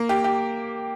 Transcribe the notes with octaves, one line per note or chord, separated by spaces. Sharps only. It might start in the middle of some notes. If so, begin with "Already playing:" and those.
Already playing: A#3
G4
G4